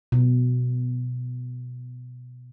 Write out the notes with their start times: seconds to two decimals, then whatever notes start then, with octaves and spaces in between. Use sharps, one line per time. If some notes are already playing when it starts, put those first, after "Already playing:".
0.12 B2